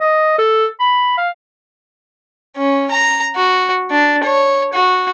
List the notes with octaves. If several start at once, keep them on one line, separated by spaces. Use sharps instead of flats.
D#5
A4
B5
F5
C#4
A#5
F#4
D4
C#5
F#4